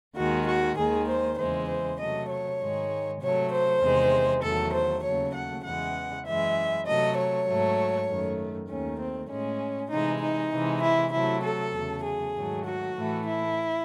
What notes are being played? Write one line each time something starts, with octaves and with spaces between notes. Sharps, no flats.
D#2 D#3 G#3 F#4
F#4
D#2 D#3 G#3 G#4
C5
E2 C#3 E3 G#3 C5
C5
C3 F#3 A3 D#5
C#5
G#2 D#3 G#3
C3 F#3 A3 C#5
C5
E2 C3 D#3 G#3
E2 D#3 F#3 A3 A4
C5
D#2 C#3 F#3 A3 C#5
F#5
E2 C#3 E3 G#3 F#5
F#2 E3 G#3 E5
C3 F#3 A3 D#5
C#5
G#2 F#3 A3
F#2 D#3 A3
D#2 D#3 A3 C#4
C4
A2 G#3 C#4
C3 E3 G#3 D#4
D#4
C3 E3 G#3
E4
C3 F#3 A3 E4
A4
E2 C#3 F#3 A3
G#4
G#2 D#3 F#3 A3
F#4
A2 E3 A3
E4